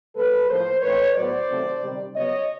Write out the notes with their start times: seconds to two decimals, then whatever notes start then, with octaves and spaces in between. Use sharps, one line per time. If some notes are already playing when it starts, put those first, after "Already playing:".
0.16 B2 G3 A#3 A4 B4
0.49 A2 F3 A#3 A#4 C5
0.82 A2 E3 A3 C4 B4 C#5
1.15 A2 F#3 B3 C5 D5
1.49 C3 D#3 F#3 A3 C4
1.82 C3 D#3 G3
2.15 C#3 F#3 B3 C#5 D#5